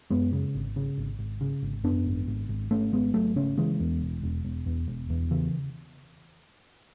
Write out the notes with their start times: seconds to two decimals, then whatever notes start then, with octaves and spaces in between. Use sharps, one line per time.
0.10 F#2 G#3 B3
0.33 C#3
0.55 G#1
0.76 C#3
0.98 G#1
1.19 G#1
1.41 C#3
1.62 G#1
1.84 F#2 B3 D4
2.06 G#1
2.28 G#1
2.49 G#1
2.71 G#1 A3 C#4
2.93 G#1 G#3 B3
3.14 G#1 F#3 A3
3.36 C#3 A3 C#4
3.58 C#3 E3 G#3
3.80 E2
4.01 E1
4.23 E1
4.45 E1
4.66 E2
4.88 E1
5.10 E2
5.31 C#3 E3